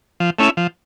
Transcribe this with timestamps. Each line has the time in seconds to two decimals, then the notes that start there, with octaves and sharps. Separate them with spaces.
0.20 F3
0.39 A3 C#4 E4
0.57 F3